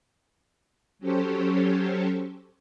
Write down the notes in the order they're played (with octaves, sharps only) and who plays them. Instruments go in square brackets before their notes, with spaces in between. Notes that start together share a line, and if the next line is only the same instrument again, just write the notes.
[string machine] F#3 C#4 G4 A4 C5 C#5